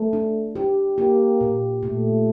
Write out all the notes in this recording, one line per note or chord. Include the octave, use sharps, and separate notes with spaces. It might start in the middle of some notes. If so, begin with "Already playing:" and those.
Already playing: A3
D4
G4
A#3 G4
A#2
A#2 A3